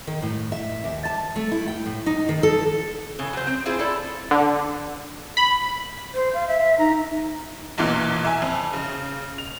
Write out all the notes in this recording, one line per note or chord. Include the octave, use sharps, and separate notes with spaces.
D#3
A2
E5
D#2
A5
A3
E4
G5
A2
D#4
D#3
A4
C#3 E3
F#3 C5
C4
C4 E4 F4 G#4 C5
E4 A4 D5
D3
B5
C5
F5
E5
D#4 A#5
B1 E2 A#2 E3
E5 G#5
F2
C#3
F7